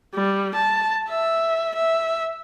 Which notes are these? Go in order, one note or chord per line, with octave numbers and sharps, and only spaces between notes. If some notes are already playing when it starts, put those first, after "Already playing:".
G3
A5
E5
E5